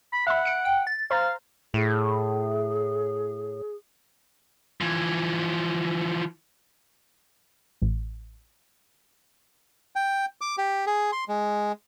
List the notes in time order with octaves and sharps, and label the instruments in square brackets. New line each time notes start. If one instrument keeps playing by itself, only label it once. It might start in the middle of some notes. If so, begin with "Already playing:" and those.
[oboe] B5
[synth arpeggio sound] E5 B5 [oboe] F#5
[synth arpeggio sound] C#7 D7
[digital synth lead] G5
A6
[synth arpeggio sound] C5 A#5 [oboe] F5
[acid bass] A2 [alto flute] G#4
[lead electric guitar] E3 F3
[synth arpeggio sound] A1
[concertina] G5
D6
G4
G#4
C6
G#3